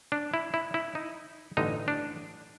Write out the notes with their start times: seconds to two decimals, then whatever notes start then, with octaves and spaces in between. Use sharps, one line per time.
0.12 D4
0.34 E4
0.54 E4
0.74 E4
0.95 D#4
1.57 A1 G2 D3 D#4
1.88 D4